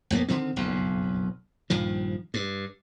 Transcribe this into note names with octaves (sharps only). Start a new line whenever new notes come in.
A#1 F2 A#3 B3
D3 D#3 C4
F#1 B1 F2
A#1 G2 D#3 F3
G2